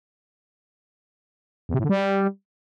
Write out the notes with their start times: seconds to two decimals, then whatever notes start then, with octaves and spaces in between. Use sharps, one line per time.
1.69 E2
1.74 C3
1.79 A2
1.84 D3
1.89 G3